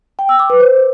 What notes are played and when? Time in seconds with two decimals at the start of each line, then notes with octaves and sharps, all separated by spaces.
0.19 G5
0.29 E6
0.39 D6
0.50 B4
0.60 C5